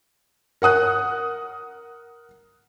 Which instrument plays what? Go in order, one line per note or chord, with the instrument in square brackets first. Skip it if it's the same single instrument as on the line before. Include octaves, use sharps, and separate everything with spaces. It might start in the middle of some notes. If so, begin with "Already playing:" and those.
[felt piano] A#4 F#5 D#6 F#6